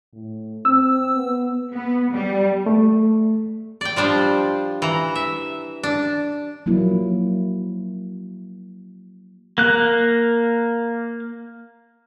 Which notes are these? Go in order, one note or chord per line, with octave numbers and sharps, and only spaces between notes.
A2
C4 E6
B3
B3
G3
A3
D5 G5
F3 G3 D4 C5
E3 A#5
E5
D4
F3 F#3 A#3 E4
A#3 F#6